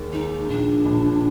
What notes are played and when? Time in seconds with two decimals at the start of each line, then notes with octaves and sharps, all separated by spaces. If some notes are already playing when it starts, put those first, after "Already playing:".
Already playing: D#2 D#3 G#3
0.13 G#3 D#4
0.49 A#1 D4
0.85 A#1